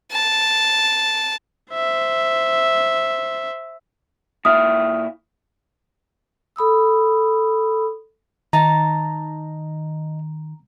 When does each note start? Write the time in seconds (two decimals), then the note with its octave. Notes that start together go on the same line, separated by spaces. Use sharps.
0.11 A5
1.74 C5 E5
4.45 A#2 E4 E5 D#6 F6
6.56 A4 B5 D#6 E6
8.53 D#3 D#4 A5 A#5